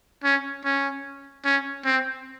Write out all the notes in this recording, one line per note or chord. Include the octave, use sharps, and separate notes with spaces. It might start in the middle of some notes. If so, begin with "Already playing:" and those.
C#4
C#4
C#4
C4